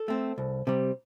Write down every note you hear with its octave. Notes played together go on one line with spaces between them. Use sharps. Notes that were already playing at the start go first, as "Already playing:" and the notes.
Already playing: A4
A3 C4
C2
C3 G3